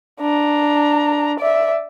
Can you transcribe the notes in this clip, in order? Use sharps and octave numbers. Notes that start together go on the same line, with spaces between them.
D4 A#5
D5 E5